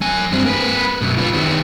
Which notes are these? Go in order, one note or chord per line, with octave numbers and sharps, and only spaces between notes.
F#3 G#5
G2 C4
A#3 B4
F#2 B2
F4 B4
D#3 B3